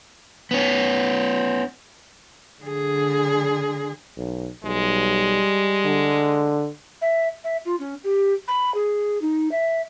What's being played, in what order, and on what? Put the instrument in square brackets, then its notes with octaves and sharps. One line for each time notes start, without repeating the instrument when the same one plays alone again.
[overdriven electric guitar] B3 C#4
[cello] D3 G#4
[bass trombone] B1
[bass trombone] B1 [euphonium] G3 [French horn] G#3
[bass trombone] D3
[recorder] E5
E5
F4
C#4
G4
B5
G#4
D#4
E5